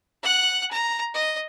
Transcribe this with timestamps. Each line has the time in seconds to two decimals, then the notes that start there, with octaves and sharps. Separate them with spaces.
0.23 F#5 F#6
0.71 A#5
1.14 D#5